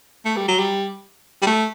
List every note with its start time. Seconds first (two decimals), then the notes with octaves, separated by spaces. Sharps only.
0.25 A3
0.37 G3
0.48 F#3
0.59 G3
1.42 G3
1.47 A3